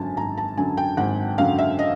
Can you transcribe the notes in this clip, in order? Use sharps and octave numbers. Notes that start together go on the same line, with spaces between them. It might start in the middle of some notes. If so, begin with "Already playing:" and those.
Already playing: G#1 F#2 D3 F#3 G#5 A5
G#1 A#5
A5
F#2 D3 F#3 G#5
G5
G#1 F#5
F#2 D3 F#3 F5
E5
D#5